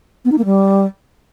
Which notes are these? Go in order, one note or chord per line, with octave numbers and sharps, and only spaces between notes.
B3
D#4
A#3
G3